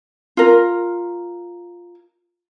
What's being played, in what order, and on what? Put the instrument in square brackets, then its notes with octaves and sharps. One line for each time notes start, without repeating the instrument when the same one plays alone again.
[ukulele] F4 A#4